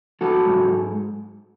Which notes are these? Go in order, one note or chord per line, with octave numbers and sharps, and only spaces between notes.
F#3 F#4 A4
G#2